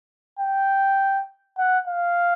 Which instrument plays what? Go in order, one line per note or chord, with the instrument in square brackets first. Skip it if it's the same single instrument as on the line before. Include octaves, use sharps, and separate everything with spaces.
[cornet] G5
F#5
F5